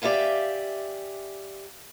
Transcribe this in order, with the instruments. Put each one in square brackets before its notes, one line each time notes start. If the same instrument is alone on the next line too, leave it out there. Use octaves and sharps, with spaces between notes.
[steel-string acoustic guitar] G4 D5 E5 F5 G#5